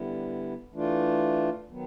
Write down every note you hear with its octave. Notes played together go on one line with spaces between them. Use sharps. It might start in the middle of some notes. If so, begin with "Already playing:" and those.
Already playing: D3 G3 B3 E4
E3 A3 D4 F4
D#3 F#3 B3